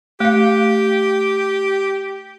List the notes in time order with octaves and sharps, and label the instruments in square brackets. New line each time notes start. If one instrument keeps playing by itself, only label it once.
[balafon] A3 F5 [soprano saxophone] G4